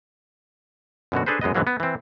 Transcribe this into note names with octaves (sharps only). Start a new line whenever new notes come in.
F#2 B2 D3 F#4
D4 G#4 A4 B4 C5
F#2 G#3 B3 D#5
G#2 D3 E3 F#3 A#3
B3
E3 C4